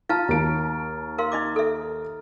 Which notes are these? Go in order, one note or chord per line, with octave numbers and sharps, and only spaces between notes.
F4 F5 A5 A#5 F6 A6
D#2 A#3 D7
A#4 F5 C6
D#4 D#5 D6
A4 E5